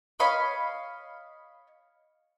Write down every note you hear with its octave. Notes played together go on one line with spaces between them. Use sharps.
C#5 D#5 F5 B5